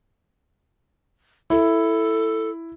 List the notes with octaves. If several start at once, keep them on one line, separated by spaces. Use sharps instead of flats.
E4 A4